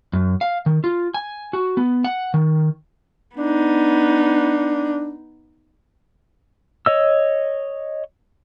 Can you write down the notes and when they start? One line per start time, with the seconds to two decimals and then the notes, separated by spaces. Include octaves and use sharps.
0.13 F#2
0.41 F5
0.66 D#3
0.84 F4
1.14 G#5
1.53 F#4
1.77 B3
2.04 F#5
2.34 D#3
3.37 B3 D4 D#4
6.86 C#5 D#5 E6